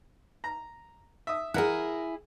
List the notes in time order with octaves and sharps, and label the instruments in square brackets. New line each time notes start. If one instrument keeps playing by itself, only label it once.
[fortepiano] A#5
E5 D#6
[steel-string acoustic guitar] E4 G#4 [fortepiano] A#4 F#5